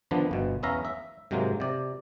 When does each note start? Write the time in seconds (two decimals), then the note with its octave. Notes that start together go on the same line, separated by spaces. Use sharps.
0.11 D3 D#3 F3 B3 D4
0.31 G1 B2
0.63 E2 B3 C#4 E5 F5 A#5
0.85 E5
1.31 G#2 C3 F#3 G#3 A#3
1.60 C3 D5